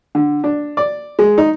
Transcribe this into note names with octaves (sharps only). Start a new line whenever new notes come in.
D3
D4
D5
G#3
D#4